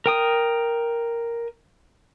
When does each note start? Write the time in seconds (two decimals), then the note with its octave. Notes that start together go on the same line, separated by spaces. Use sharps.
0.06 A#4 G5 D#6